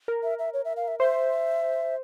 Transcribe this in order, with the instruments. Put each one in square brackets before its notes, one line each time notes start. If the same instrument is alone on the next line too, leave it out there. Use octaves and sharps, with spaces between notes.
[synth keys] A#4
[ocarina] E5
E5
C#5
E5
F5
E5
[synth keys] C5 [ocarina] E5